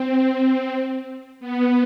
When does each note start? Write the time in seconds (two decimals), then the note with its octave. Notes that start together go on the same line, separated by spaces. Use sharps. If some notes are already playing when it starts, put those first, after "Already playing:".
Already playing: C4
1.40 B3